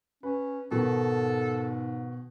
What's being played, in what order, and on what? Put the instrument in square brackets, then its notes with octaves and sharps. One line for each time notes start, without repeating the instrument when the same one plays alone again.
[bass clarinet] C#4 [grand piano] B4
[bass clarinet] G#2 [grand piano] B2 D#3 [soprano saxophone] A4